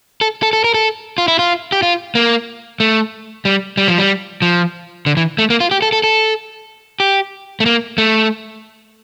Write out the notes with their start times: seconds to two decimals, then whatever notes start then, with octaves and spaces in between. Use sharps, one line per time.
0.21 A4
0.43 A4
0.53 A4
0.64 A#4
0.74 A4
1.18 F4
1.28 E4
1.39 F4
1.72 G4
1.83 F4
2.15 A#3
2.80 A3
3.45 G3
3.77 G3
3.88 F3
3.98 G3
4.42 F3
5.06 D3
5.17 E3
5.38 A3
5.50 A#3
5.60 F4
5.71 G4
5.82 A4
5.93 A4
6.04 A4
7.00 G4
7.60 A3
7.66 A#3
7.98 A3